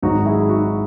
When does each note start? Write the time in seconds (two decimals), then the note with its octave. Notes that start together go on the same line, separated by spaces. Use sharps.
0.03 G#1 G#2 F#3 D#4 F#4
0.25 E4 G#4
0.40 E4
0.49 D#4 F#4